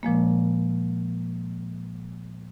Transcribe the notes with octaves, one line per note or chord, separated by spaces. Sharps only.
A#2 F3 G#3 A#3